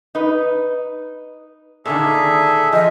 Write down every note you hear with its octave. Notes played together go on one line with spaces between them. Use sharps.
D#4 B4
A#2 D3 D#3 G#4 A4 E5
F3 D#5